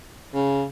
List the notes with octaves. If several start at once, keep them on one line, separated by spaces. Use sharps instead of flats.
C#3